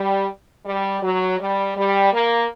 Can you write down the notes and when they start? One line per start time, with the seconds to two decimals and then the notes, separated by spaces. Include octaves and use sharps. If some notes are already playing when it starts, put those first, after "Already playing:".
Already playing: G3
0.65 G3
1.02 F#3
1.39 G3
1.76 G3
2.12 A#3